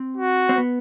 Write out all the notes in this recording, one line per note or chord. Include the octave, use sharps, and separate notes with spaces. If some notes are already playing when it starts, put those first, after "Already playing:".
Already playing: C4
F#4
C4
B3